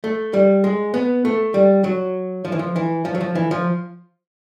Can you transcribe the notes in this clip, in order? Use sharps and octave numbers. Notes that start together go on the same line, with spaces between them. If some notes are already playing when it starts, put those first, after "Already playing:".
A3
G3
G#3
B3
A3
G3
F#3
F3
E3
F3
E3
F3
F#3
F3
E3
F3